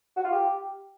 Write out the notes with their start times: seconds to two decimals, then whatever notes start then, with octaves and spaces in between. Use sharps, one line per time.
0.17 F#4
0.24 F4
0.32 G4